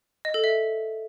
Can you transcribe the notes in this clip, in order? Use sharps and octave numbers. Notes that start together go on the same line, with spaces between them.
D#5
A4
E5